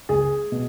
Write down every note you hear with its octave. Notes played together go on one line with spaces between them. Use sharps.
C#2 G#4
B2